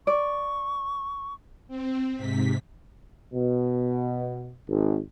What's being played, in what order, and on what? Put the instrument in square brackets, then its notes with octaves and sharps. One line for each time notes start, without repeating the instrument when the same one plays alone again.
[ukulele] D5 [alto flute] C#6
[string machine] C4
G#2 C3 B6
[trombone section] B2
G#1